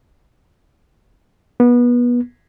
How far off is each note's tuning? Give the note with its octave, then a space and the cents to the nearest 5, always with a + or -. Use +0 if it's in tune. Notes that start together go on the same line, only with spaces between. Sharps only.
B3 -25